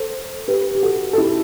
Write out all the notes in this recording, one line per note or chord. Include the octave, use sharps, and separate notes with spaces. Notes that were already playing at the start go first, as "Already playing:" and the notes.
Already playing: A4 C5
G4 B4
G4
F#4 A4
A4
E4 G4